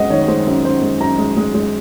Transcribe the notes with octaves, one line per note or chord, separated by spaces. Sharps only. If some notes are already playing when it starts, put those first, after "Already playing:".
Already playing: F#2 G#3 C4 D#5 F#5
D#3 C#5
G#3 C5
F#2
F#2 C5
G#3
F#2 A#5
G#3
G#3
G#3